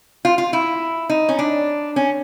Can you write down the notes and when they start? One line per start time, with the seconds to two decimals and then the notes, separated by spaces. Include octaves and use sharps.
0.25 F4
0.38 F4
0.53 E4
1.09 D#4
1.29 C#4
1.39 D4
1.96 C#4